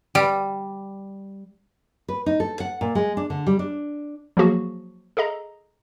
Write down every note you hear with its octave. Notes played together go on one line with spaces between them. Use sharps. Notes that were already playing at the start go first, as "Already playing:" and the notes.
G3
B4
D#4
A4
F#5
A#2
G#3
D4
D3
G3
D4
F3 F#3 A#3 F#4 G#4
G#4 A4 D#5 A#5